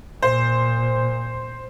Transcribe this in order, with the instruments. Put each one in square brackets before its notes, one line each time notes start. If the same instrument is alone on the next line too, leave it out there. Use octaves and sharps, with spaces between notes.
[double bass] A#2 [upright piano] C5